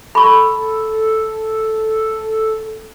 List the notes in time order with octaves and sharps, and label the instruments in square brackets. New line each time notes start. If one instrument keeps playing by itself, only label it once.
[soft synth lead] A4 [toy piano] B5 C#6